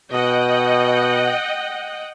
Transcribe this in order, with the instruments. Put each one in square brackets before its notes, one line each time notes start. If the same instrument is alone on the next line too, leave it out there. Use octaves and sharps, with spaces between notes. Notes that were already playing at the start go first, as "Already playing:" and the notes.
[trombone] B2 [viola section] D#5 F#5 G5